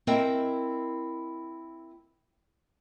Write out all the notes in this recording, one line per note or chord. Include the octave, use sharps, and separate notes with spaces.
C4 E4 A#4 D#5 G5